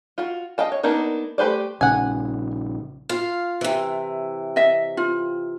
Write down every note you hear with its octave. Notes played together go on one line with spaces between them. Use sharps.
F4 F#4
D#5 F5 G5 A5
C#5
A#3 B3 D4 D#4 A#4
A3 G4 B4 C5 D5
A#1 C#3 F#5 G#5
F4 F5
C3 E3
D#5 E5
F4